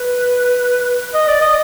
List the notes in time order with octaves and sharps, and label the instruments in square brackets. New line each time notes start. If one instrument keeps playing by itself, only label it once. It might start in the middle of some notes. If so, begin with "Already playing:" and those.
Already playing: [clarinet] B4
D#5
D5
D#5